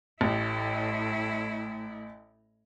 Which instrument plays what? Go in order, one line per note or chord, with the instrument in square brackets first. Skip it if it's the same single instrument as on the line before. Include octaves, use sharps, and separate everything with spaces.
[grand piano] A1 [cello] A2 E4